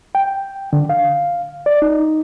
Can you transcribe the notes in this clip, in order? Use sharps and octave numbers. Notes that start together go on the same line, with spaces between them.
G5
D3
F5
D5
D#4